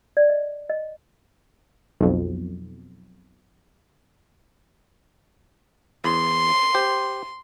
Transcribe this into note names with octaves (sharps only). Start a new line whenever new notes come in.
D5
D#5
D#5
B1 F2
E2 C6
G4 C5